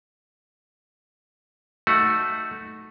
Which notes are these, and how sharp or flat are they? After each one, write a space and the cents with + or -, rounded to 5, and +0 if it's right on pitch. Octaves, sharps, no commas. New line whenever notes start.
A3 +0 D#4 +0 F#4 +0